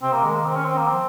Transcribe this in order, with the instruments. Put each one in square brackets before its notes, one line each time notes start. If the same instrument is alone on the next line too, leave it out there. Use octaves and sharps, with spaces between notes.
[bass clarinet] C3 [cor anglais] C4
[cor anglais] A#3
[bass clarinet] D#3 [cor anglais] G#3
[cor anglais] A#3
C4
C#4
C4
A#3
[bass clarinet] F3 [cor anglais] C4